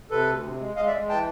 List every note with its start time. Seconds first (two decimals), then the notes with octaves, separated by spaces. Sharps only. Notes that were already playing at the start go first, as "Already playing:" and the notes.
0.11 C3 A4 B4
0.27 D2
0.43 C3
0.59 G#3
0.76 G#3 D#5 F5
0.87 D5 E5
0.93 G#3
1.09 E3 G5 A5